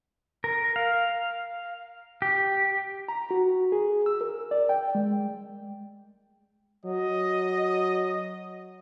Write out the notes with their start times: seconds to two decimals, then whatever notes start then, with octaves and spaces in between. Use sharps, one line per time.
0.44 A#4
0.76 F5
2.22 G4
3.08 A#5
3.31 F#4
3.72 G#4
4.06 E6
4.21 A#4
4.51 D5
4.69 G5
4.95 G#3
6.85 F#3 D#5